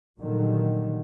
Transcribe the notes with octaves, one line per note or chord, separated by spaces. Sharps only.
A#2 D3 D#3 F#3 G3